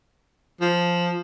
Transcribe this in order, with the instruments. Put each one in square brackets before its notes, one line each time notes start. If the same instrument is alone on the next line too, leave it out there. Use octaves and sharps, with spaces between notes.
[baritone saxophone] F3